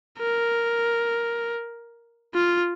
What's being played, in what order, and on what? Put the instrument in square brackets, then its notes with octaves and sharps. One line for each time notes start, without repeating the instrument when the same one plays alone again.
[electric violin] A#4
F4